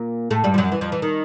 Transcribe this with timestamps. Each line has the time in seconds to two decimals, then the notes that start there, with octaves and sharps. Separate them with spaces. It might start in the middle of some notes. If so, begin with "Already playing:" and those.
Already playing: A#2 A#3
0.30 A2 A3
0.44 G2 G3
0.54 F3
0.58 F#2 F#3
0.72 E3
0.81 F2 F3
0.92 E3
1.02 D#3